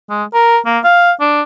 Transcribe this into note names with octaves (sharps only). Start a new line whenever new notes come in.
G#3
A#4
A#3
F5
D4